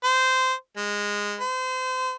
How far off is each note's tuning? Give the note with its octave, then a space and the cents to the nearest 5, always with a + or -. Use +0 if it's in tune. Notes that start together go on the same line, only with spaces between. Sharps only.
C5 -15
G#3 -15
C5 -30